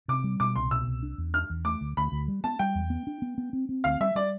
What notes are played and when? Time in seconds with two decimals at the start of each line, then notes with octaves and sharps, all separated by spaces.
0.08 C3 D6
0.24 G3
0.40 B2 D6
0.56 C2 C6
0.71 B2 E6
0.87 C2
1.03 D4
1.18 E2
1.34 D4 F6
1.50 E2
1.65 A3 D6
1.81 D2
1.97 D2 B5
2.12 D2
2.28 G3
2.44 B3 A5
2.59 G3 G5
2.75 E2
2.90 B3
3.07 D4
3.22 B3
3.38 B3
3.53 C4
3.69 C4
3.84 D2 F5
4.00 G3 E5
4.15 G3 D5